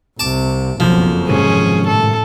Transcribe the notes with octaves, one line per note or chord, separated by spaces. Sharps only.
C2 C3 A5 D6
F#1 B1 F2 B2 F3
G#2 C3 D#3 C#4 G#4
A2 A4